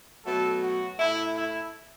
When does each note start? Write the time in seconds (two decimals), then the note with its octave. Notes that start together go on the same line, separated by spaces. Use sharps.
0.25 B2 F#3 A3 A4
0.61 F#4
0.98 A2 A3 E4
1.35 E4